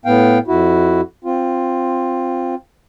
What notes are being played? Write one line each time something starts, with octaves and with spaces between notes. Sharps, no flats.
A2 B3 F5 G5
F2 E4 F#4
C4 F4